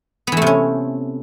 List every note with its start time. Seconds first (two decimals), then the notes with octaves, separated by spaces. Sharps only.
0.27 B3
0.32 E3
0.37 A3
0.42 C3
0.47 C#4